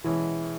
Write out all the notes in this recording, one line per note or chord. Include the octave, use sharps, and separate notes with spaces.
B2 E3 G#3 C#4 E4